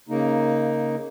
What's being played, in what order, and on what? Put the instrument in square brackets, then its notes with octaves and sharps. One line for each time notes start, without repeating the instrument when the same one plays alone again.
[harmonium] C#3 A#3 D#4